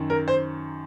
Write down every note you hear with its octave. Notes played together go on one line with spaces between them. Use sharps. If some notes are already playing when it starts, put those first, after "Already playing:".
Already playing: F#2 D#3
A#4
C5